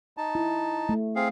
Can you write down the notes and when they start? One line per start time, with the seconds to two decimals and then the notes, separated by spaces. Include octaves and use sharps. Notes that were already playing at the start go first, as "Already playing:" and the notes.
0.17 D#4 A5
0.35 E4
0.89 A3
1.16 C4 G#4 F5